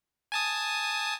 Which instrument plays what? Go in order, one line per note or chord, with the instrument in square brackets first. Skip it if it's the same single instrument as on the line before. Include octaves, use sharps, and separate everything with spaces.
[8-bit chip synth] G#5 A5 D#6